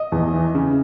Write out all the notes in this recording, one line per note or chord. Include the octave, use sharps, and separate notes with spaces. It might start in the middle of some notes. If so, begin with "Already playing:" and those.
Already playing: D#5
E2
E3
C#3